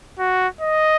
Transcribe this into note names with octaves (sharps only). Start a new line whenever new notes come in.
F#4
D#5